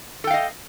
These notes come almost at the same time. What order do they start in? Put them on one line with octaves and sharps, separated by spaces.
A4 G5 F5 D#5